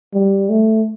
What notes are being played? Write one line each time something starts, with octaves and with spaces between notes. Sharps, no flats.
G3
A3